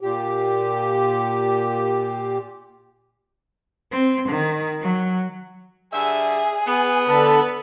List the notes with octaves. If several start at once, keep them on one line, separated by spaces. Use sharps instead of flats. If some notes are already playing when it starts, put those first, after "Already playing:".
A#2 G4
C4
D#3
F#3
G2 D3 G#4 E5
B3
D3 A4 B4